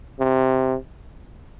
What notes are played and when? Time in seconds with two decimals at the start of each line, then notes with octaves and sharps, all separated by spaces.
0.20 C3